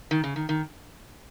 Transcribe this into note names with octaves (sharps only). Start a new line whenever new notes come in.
D#3
C#3
D#3
D#3